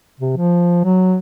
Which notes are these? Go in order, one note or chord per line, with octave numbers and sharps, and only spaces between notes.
C3
F3
F#3